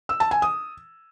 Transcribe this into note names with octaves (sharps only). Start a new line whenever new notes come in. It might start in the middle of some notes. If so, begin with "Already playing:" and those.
E6
A5
G#5
D#6